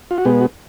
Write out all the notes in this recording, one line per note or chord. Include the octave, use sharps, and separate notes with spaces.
F4
F#4
B2 G#3 B3 G4
F#4